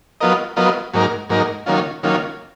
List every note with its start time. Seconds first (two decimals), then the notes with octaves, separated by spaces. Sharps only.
0.21 F#3 B3 F4 A#4 D#5
0.56 F#3 B3 F4 A#4 D#5
0.94 G#2 F#3 A#3 D#4 A#4
1.29 G#2 F#3 A#3 D#4 A#4
1.66 D#3 F#3 A#3 C#4 F4
2.03 D#3 F#3 A#3 C#4 F4